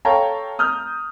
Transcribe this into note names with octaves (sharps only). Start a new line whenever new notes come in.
A4 C#5 F5 G5 A5 A#5
A#5 D#6 F6 G6